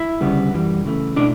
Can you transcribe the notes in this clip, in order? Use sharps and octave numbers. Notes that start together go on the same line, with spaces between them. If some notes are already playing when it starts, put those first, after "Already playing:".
Already playing: E4 E5
D2 C#3 G3 B3
F#2 E3 G3
C#3 E3 A3
B2 A3 D4 E4 D5